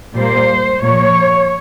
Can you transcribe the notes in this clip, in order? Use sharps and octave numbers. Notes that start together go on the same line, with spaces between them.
A#2 G3 A#3 C5
A#2 F3 A#3 C#5